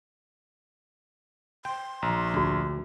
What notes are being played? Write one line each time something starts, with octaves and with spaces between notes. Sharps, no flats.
G5 C6
A#1 A#5
D2 F#4 D5